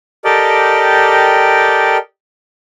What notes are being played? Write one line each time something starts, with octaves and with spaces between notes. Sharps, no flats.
G4 A4 A#4 D5 D#5 G5